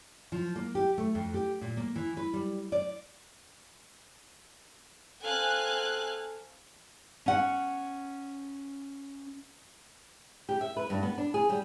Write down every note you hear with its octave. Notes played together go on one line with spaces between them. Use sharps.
F3
A#3
G4
A3
F2
G4
A#2
A#3
E3
B4
G3
D5
C4 A4 F5 G#5 F#6
C#4 F#5
G4
E5
B4
G2
B3
D4
G#4
G3